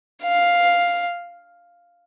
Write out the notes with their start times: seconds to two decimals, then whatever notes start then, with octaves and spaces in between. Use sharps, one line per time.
0.23 F5